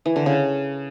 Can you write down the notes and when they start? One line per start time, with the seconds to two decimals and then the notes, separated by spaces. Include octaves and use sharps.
0.06 E3
0.16 D3
0.26 C#3